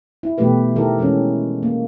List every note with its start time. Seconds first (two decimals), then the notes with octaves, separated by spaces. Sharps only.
0.23 E4
0.38 B2 E3 A3 G4 B4
0.76 D#3 E4 G4 A4 A#4
0.99 D#3 E3 G#3 C#4
1.63 A#3